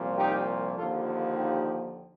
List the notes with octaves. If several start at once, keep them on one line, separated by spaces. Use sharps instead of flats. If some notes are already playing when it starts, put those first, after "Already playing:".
Already playing: C2 A#2 F3
D#4 G4
D#2 D3 F3 F4 A4
F4 A4
D#4 G4